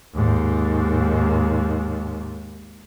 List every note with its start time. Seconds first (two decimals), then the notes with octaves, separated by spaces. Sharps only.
0.15 D#2 G#2